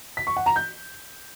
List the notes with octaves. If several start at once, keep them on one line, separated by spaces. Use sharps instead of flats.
B6
C#6
F#5
A#5
G6